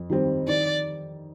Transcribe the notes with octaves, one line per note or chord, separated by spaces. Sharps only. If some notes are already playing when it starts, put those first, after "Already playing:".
Already playing: F2
D#3 G3 C4
D#3 D5